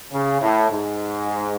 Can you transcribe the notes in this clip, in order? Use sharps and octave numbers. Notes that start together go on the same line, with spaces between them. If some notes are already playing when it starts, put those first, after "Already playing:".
C#3
A2
G#2